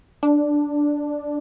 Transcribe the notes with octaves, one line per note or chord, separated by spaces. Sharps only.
D4